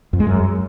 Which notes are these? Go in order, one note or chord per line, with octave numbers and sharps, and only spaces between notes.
F2
G#3
F#2